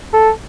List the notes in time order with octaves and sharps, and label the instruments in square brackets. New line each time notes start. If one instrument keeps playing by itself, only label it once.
[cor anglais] A4